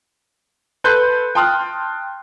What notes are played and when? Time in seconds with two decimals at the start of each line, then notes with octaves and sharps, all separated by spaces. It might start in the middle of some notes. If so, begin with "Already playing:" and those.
0.84 A4 B4 C6 F#6 G6
1.35 G5 A5 C6 D#6 F6 F#6